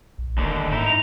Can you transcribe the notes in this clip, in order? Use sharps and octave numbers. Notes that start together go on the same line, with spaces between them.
A#1
E1 D#2 D3
G#2 D#4 E4
F7